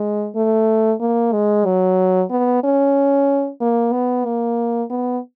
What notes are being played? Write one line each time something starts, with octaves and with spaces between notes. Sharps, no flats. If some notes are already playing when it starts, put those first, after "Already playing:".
Already playing: G#3
A3
A#3
G#3
F#3
B3
C#4
A#3
B3
A#3
B3